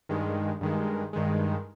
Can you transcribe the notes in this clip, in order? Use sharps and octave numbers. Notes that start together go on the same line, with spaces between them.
G2 D#3 G#3
G2 D#3 G#3
G2 D#3 G#3